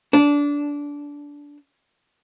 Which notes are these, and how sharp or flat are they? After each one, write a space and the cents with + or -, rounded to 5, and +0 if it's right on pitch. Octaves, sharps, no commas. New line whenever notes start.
D4 -20